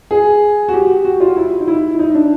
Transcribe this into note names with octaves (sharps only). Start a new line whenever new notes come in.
G#4
F#4
G4
F#4
F4
E4
D#4
E4
E4
D#4
D4